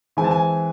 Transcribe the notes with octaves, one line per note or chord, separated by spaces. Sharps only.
E3 G#3 C4 G#5
A5
G#5